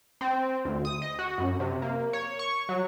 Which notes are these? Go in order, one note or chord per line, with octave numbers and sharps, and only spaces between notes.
C4
D2
D#6
D#5
F#4
F#2
C3
A#3
C#5
C#6
F#3